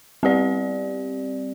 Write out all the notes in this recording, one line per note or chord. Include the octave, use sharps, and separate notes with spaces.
G3 C4 G4 D5